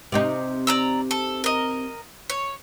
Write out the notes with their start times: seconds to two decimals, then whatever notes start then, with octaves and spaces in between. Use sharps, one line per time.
0.12 C3 C4 D#4
0.67 D5 A#5 E6
1.11 A4
1.44 A#4 D#5
2.30 C#5